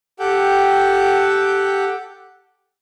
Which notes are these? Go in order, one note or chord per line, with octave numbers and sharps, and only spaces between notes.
G4 A4 F#5 G5